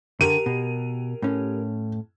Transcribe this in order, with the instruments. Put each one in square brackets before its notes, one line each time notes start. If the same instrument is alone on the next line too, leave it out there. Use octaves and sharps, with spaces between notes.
[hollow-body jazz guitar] D3 [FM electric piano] G4 A#4 [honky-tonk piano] D#7
[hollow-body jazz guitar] B2
A2 C#4